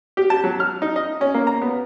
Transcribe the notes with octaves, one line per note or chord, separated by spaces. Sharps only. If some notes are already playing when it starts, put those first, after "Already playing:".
G4
A5
F#3
F6
D#4
D#5
C#4
A#3
A#5
B3